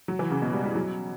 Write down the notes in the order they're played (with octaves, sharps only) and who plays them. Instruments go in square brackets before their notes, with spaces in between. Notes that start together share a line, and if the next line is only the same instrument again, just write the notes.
[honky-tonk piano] F#3
E3
C#3
B2
G3
G3
F#3